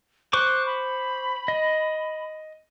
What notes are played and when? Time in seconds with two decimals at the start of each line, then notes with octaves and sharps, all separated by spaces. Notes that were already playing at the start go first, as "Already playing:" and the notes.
0.33 C5 C#6 D6 F#6
0.66 B5
1.48 D#5